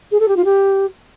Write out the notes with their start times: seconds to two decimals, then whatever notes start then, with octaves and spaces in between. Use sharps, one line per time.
0.11 G#4
0.19 A4
0.28 G4
0.36 F4
0.44 G4